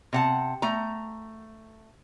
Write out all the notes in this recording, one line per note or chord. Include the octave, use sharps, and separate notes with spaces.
C3 F#5 A5
A3 A#5